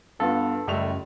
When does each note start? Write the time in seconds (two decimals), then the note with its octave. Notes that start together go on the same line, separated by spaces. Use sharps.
0.20 G2 B3 F4 A4
0.68 C#2 F#2 G3 A3 F7